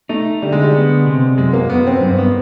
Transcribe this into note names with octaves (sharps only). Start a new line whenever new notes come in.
A3 D#4
D3 G3
G#3
G3
B3
C3
F#2 G#3
A#3
F#2 B3
C4
G2 C4
B3